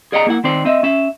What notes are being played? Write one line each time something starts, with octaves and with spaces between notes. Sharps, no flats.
G#4 D5 D#5 F#5 G5 A#5
A#3 E4 F#5
D#3 C4 C5 D5
C4 D#5 E5
C#4 E5